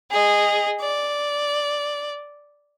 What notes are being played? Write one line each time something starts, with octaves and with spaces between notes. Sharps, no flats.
G#4 D#5
D5